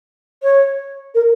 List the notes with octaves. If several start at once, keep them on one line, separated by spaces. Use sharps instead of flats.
C#5
A#4